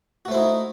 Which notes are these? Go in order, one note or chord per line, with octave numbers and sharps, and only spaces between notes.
A3 D#4 E4 F#4 C5